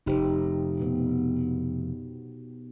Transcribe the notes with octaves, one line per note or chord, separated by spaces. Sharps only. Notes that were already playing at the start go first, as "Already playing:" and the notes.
F1 D#4 G4 C5
B2 B3